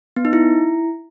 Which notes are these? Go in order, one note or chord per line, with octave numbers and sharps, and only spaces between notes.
B3
D#4
E4